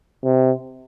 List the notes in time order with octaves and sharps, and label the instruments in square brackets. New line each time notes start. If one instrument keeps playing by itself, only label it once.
[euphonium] C3